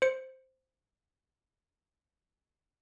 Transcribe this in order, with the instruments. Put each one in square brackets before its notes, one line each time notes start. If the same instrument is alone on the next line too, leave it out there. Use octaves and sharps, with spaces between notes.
[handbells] C5 C#7